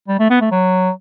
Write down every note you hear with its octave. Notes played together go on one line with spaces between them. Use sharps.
G3
A3
B3
A3
F#3